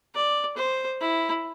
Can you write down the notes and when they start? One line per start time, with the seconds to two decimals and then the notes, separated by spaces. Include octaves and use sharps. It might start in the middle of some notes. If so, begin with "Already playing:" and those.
0.15 D5
0.57 C5
1.00 E4